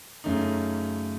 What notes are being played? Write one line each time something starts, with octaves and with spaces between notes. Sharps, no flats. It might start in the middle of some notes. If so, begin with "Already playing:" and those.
F#2 C#3 A3 D#4